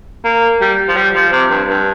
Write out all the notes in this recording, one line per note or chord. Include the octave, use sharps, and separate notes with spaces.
A#3
G3
F3
G3
F3
C3
G2
G2